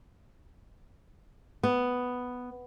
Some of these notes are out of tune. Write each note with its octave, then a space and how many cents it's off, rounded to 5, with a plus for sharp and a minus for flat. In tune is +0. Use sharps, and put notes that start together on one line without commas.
B3 +5